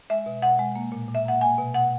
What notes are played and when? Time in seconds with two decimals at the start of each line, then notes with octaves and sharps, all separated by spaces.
0.10 G#3 E5
0.26 B2
0.42 B2 F#5
0.59 G#3
0.76 A#3
0.92 A#2
1.08 A#2
1.15 E5
1.25 A#3 F#5
1.41 A#3 G#5
1.58 B2
1.74 B2 F#5